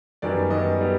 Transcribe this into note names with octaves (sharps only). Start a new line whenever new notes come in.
F#2 D#3 G3 B3 D5
F#2 D#3 G3 B3 D#5
D#3 G3 B3